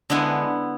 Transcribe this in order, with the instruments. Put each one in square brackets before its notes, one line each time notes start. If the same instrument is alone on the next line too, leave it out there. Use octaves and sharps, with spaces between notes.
[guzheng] D3 G#3 B3 E4